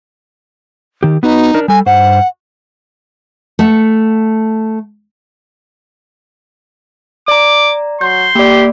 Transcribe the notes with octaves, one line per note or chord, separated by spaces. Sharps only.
D#3 G4
B3 D#4 F#4 B4
D4 A#4
G3 A4 G#5
G2 C5 F#5
A3 F#5
D5 A#5 D6
F#3 C6 G6
A#3 G4 D5